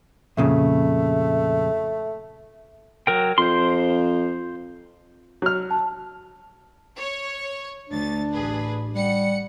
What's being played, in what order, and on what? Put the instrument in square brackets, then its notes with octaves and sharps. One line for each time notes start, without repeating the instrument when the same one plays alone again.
[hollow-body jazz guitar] F2 A#2 C#3 [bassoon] A3
[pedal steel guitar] F#3 A#4 G5
[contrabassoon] F2 [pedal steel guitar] C5 C6
[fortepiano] F#3 F6
[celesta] A5
[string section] C#5 C#6
[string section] D2 A6 [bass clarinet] D4
[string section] A1 G#4 B4
[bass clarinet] G3 [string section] F#5 C#7